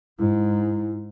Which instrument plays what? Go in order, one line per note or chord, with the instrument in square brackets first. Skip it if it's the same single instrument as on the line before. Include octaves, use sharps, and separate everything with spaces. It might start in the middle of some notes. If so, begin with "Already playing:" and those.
[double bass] G#2 [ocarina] E4